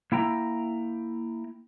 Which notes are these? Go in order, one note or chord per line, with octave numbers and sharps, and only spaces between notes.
A#3 E4 G5 A#5